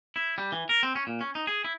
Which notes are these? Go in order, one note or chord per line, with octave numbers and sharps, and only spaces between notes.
E4
G3
E3
A#4
C4
C#4
A#2
C#4
D#4
G#4
E4